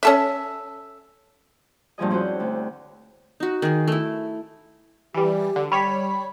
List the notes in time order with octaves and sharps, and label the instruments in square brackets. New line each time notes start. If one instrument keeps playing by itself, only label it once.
[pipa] C#4 A4 E5
[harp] G2 A#2 F3 G#4 D#5
C4 C#4 E4 F#4 C5
D2
[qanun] D#4 F#4
D#3 G#4
A3 E4
[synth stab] E3 G3 [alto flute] G4
[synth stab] D3
[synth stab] G3 C#5 B6 [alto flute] B5